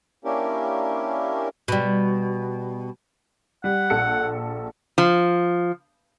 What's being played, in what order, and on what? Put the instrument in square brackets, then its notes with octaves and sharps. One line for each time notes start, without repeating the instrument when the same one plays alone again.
[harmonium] A#3 C#4 D4 E4 G4 A#4
[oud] B2 G3
[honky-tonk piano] G3 [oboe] F#5
[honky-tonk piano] A#1 A4 C#7
[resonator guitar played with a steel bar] F3